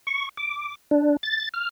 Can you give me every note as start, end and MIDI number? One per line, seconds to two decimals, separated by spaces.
0.07 0.29 85
0.37 0.75 86
0.91 1.16 62
1.23 1.49 93
1.54 1.69 89